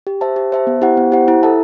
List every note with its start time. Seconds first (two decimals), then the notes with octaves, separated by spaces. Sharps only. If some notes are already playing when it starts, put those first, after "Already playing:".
0.07 G4
0.21 C5 E5 A5
0.36 G4
0.52 C5 E5 A5
0.67 B3
0.82 E4 G4 C5 F#5
0.97 B3
1.12 E4 G4 C5 F#5
1.28 E4
1.43 A4 E5 A5